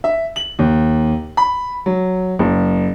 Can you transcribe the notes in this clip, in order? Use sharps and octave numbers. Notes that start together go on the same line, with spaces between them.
E5
F#7
D#2
B5
F#3
F#1